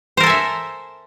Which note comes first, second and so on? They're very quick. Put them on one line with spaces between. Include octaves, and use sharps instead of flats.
C5 A#4 A4 G#5 E5